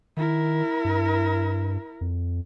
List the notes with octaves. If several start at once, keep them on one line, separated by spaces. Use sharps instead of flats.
D#3 E4 A#4
G2
F2